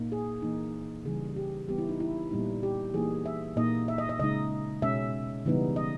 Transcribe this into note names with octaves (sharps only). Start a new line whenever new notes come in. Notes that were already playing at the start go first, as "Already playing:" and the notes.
Already playing: A#2 A#3 D#4
G#4
E3 A#3 D#4
C#3 E3 G3 G#4
G4
E3 G3 B3 G4
E4
D#4
E4
A#2 G3 B3 D#4
G4
E3 A#3 D#4 G#4
E5
A#2 A#3 D#4 D#5
E5
D#5
D#5
C#3 G#3 D#4 D#5
B2 G#3 C#4 E5
C#3 E3 G3 B3 D#4
D#5